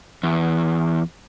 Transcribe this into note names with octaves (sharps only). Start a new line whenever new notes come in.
E2